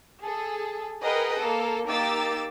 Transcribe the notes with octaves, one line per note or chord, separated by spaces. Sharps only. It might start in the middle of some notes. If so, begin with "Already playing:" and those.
G#4 A4
G#4 A#4 B4 D#5 F#5 G5
A#3 A4
A#3 D#4 G4 D6 E6 A6